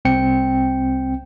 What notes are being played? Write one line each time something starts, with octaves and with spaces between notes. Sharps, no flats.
C2 C4 G5 C#7